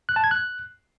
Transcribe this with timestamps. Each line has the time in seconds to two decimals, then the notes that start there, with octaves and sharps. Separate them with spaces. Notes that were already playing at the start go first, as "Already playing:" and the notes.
0.09 F#6
0.16 A5
0.24 G#6
0.31 F#6